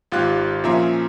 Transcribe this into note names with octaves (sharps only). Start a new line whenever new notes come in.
G#1 F4 G4 F5 F#6
A#2 F3 C#4 E5 A#5 C6